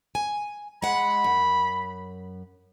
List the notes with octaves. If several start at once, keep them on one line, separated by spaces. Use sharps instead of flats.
G#5
G#3 F#5 B5
F#2